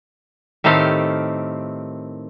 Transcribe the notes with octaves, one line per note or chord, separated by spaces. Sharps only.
A2 D#3 A3 C4 G4 F5